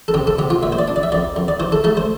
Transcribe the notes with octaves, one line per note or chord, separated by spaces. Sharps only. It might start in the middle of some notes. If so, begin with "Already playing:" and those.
A4
C3 G4
A4
C3 G4
F4
A#2 E5
C5
D5
D4
D5
E5
F2 D5
F2
D5
E3 C5
A4
A3 A4
C5